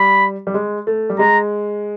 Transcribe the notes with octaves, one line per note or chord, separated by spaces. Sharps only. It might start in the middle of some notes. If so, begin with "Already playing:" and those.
Already playing: G3 B5
G3
G#3
A3
G3
G#3 A#5